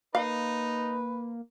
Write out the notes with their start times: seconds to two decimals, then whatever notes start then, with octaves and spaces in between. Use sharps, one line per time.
0.15 A#3 D#4 B4 F5